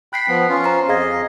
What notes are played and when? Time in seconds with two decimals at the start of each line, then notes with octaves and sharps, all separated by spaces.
0.13 G5 B5 F#6 B6 C7
0.28 F3 B3
0.49 C#4 F4
0.64 C5 A#5 C7
0.89 F2 G#4 D#5 F5 G#6